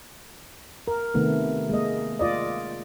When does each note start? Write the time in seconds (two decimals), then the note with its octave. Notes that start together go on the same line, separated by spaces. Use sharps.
0.88 A#4
1.14 C3 D#3 A3 B3
1.70 G#3 A#3 D#5
2.19 F4 D5 D#5